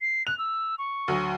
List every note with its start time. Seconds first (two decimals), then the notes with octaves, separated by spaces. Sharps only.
0.01 C7
0.27 F#6 F7
0.38 E6
0.79 C#6
1.08 D2 F#3